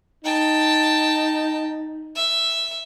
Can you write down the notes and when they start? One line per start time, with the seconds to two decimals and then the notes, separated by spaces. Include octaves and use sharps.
0.24 D#4 G5 A5
2.15 E5